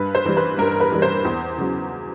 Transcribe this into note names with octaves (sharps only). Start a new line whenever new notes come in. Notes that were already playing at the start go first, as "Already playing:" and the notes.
Already playing: G2 B4
C5
E3 G3
B4
G2 A#4
B4
E3 G3
C5
E2
C#3 F#3